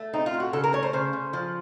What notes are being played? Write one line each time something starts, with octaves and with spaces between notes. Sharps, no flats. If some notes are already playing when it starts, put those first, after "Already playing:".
Already playing: A3
C4 D#4
F4
A2
F#4
C#3 A4
A#4
A3 C#5
C5
C#3 C5
C#3
F3